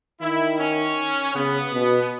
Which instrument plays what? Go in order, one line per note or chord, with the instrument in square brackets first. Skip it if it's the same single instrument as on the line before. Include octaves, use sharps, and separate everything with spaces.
[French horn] D#3 [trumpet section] E4
[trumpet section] C#4
[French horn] C#3 [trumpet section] B3
[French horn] B2